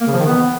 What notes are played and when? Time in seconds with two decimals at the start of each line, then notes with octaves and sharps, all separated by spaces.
0.01 A#3
0.07 C#3
0.13 F3
0.20 D#3
0.26 B3